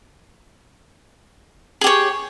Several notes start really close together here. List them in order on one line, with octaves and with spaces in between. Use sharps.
G#4 G4 C#5